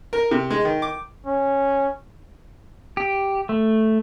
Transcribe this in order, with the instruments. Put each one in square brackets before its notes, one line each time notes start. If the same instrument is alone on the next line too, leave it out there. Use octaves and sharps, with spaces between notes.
[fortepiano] A#4
C3
G#3
D#3
D6
[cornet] C#4
[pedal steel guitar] G4
A3